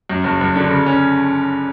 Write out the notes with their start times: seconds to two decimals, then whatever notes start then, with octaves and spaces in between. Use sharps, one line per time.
0.10 F#2
0.24 F#1
0.41 F#1
0.56 D3
0.70 C#3
0.86 C#4